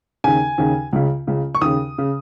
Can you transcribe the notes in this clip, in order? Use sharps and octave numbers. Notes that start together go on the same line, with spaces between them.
D#2 C#3 G#5
D#2 C#3
C#2 C#3
C#2 C#3
C#6
D#2 C#3 D#6
C#3